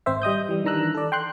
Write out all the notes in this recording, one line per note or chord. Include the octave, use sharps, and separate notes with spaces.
G#1 C4 C5 E5
G3 D#5 D#6 G6
E3 G3
D#3 E3 D4 A#5 E6 F#6
A4 D5
G5 C6 F#6